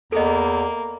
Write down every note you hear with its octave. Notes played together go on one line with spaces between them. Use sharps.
E2 A#3 A4 D#5